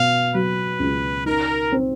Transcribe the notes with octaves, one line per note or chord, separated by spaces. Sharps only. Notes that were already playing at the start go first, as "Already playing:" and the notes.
Already playing: B2 F5
F#3 B4
C#2
D#4 A#4
C4